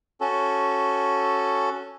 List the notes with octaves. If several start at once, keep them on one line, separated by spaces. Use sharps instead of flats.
C#4 F#4 A4